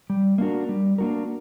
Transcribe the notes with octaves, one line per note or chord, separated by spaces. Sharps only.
G3
A#3 D4 F#4 A#4
G3
A#3 D4 F#4 A#4